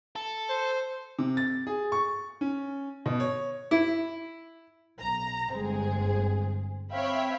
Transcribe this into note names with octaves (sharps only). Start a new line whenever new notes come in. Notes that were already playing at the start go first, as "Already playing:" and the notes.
A4
C5
C3
A6
G#4
C#6
C#4
B2
C#5
E4
B1 A#5
G1 G#3 C4 G#4
C4 C#5 E5 F5 G5 B5